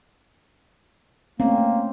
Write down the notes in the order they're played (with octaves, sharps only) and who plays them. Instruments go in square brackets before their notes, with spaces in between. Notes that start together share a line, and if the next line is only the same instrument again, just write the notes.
[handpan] A3 C4 C#4 [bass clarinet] A#3